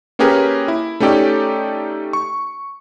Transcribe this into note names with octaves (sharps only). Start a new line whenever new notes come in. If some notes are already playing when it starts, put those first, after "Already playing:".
A#3 C#4 G4 G#4 A#4 B4
E4
A3 C#4 D#4 G4 A4 D5
C#6